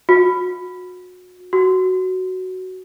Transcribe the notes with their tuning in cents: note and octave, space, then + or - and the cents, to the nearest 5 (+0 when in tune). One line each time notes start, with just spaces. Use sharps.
F#4 -30
F#4 +10